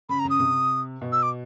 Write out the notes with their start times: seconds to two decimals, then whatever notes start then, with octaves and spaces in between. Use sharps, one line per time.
0.09 C#3 B5
0.19 A#5
0.25 C#3
0.30 D#6
0.40 C3
1.01 B2
1.12 E6
1.23 D6